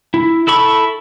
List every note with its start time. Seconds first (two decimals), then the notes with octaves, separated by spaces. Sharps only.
0.14 E4
0.47 E4 A4 B5 C#6